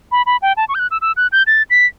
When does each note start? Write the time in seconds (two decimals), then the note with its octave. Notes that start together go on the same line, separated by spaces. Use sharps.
0.12 B5
0.26 B5
0.42 G5
0.57 A5
0.69 C#6
0.75 G6
0.79 F#6
0.91 E6
1.02 E6
1.17 F#6
1.32 G6
1.47 A6
1.70 B6